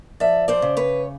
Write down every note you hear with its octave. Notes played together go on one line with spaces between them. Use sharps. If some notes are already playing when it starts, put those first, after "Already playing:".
F3 D5 E5
C5 D5
C#3
B4 C#5